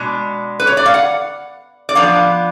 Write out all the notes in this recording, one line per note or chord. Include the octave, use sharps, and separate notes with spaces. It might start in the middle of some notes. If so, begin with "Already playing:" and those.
Already playing: B2 G#3 D4
B4
C#5
D5
F5
F#5
D5
F3 B3 D4 F5